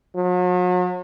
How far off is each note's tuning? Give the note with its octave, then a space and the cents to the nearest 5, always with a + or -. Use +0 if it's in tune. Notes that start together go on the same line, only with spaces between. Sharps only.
F#3 -40